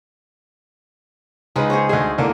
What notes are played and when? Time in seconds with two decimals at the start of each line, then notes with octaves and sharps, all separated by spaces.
1.56 C#2 G#3 D#4 B4 D#5
1.70 G#4 C5 C#5
1.89 D2 G#4 D#5
2.18 E2 D3 A#3